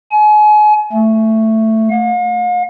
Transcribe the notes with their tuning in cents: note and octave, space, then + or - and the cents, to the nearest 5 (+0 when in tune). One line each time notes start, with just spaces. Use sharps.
G#5 +35
A3 +10
F5 +45